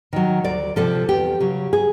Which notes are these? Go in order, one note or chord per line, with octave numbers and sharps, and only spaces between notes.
D#3 F#3
D2 D5
C3 F3 A4
E2 G4
C#3 F#3
G#4